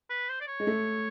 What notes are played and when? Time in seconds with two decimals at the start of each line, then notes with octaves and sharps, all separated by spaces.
0.10 B4
0.29 C5
0.41 D5
0.47 C#5
0.60 G#3
0.67 A3